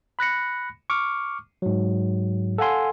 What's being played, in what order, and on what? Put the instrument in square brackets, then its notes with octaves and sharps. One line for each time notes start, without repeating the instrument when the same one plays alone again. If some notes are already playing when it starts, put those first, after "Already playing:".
[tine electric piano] B5 F#6 A#6 C#7
C#6 D6 F6
G#2 F#3
A4 F5 F#5 G#5 C6